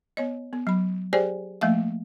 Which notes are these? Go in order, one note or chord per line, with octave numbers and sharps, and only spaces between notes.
B3 C#5 D#5
B3
F#3 B5
G4 G#4 C5 D5 G5 G#5
F3 A3 A#3 E5 F5